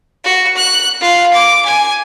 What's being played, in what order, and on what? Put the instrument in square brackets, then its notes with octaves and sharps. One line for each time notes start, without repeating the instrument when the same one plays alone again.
[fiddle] F#4
F#6
F4
D6
G#5